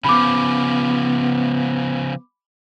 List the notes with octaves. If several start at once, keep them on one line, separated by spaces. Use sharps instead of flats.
C#3 F3 B3 B5 D6